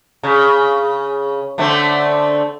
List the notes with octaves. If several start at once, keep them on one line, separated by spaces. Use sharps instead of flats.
C#3
D3 A3 C4